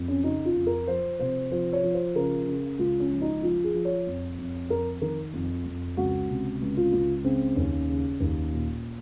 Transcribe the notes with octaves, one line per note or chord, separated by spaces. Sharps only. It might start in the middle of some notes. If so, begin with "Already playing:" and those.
Already playing: F2
C#4
C#3 D#4
F4
F2
A#4
F3 C5
C3 C5
F3 C5
C#5
F3
C5
C#3 A#4
C#3
C#2 F4
C#4
F3
D#4
F3 F4
G#4
F3
C#5
F2
F2
F2 A#4
D#3 A#4
F2
F2
C#2 F#4
C3
C#2
F4
C#2 F4
C#3 C4
D#2 C#4
C#3
D#2
A#2